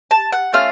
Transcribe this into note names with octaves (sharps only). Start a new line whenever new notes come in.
A5
F#5
A3 C#4 F4 F5